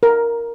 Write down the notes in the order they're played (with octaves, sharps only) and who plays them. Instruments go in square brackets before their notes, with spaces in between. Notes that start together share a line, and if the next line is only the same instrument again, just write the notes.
[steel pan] A#4